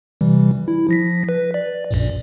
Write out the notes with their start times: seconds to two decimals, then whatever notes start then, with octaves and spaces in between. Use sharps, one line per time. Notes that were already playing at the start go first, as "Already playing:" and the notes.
0.21 C3 E3 G3
0.68 E4
0.89 F3 A#6 B6
1.29 B4
1.54 D5
1.91 A#1 F#2 A#2